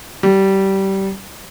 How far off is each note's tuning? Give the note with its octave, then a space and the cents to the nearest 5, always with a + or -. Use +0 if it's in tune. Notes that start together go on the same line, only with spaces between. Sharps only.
G3 -20